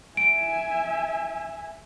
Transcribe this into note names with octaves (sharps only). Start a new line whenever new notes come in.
E5 G#5 D7